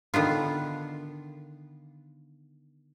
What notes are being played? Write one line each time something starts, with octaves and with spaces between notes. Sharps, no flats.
D3 D#3 B3 F4